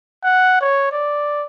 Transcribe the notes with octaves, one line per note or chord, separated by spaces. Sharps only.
F#5
C#5
D5